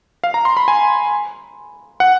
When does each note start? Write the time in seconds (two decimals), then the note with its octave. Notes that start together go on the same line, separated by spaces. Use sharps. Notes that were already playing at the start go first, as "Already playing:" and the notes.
0.24 F5
0.34 A#5
0.45 C6
0.57 B5
0.68 G#5
2.00 F#5